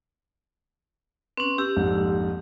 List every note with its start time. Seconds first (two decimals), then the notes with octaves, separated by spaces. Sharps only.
1.37 C4 C#4 B4
1.58 G4 E6
1.76 A#1 F2 G#2